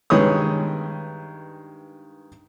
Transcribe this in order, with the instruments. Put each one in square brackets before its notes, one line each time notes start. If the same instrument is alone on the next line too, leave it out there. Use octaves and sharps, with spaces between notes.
[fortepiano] G2 D#3 G#3 B4 C#5 D#6